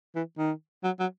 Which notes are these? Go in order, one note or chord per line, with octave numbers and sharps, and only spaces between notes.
E3
D#3
F#3
F#3